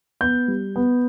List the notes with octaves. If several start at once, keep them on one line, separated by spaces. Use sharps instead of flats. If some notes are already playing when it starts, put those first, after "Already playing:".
B3 G6
G3
B3